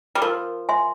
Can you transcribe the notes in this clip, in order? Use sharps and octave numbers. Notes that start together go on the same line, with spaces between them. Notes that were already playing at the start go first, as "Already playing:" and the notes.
G3
F3 A#4
E5 G#5 C6